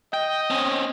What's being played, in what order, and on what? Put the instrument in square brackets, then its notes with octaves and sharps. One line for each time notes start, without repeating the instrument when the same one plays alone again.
[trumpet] D#5 [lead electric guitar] G5
[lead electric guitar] C4 C#4